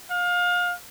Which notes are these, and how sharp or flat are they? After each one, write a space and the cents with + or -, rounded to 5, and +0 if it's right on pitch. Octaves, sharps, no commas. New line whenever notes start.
F5 +30